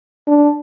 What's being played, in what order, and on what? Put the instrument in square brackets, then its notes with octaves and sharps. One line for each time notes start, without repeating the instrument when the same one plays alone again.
[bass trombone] D4